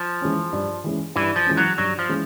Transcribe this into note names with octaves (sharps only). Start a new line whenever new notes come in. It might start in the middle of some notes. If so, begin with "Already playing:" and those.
Already playing: F3
E3 G#3 C#4
G2
E3 G#3 C#4
G2 E3
F3
E3 G#3 C#4
F#3
G2 F#3
F3
E3 G#3 C#4